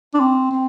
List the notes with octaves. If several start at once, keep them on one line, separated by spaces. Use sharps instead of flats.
D4
C4
C4